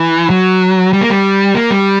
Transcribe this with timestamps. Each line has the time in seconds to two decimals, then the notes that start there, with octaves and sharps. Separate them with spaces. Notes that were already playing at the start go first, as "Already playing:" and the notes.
Already playing: E3
0.30 F#3
0.93 G3
1.01 A#3
1.10 G3
1.55 A#3
1.71 G3